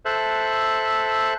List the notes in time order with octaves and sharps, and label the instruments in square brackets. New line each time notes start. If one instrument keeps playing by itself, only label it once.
[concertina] A4 C5 E5 F#6